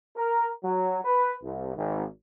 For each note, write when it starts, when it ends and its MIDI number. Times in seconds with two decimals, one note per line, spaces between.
0.16 0.47 70
0.64 0.98 54
1.04 1.31 71
1.42 1.71 36
1.75 2.03 32